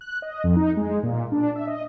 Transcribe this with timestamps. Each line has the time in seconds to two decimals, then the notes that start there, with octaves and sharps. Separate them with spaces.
0.01 F#6
0.22 D#5
0.44 F2
0.56 D#4
0.77 G#3
1.03 A#2
1.32 D4
1.56 E5
1.67 D#5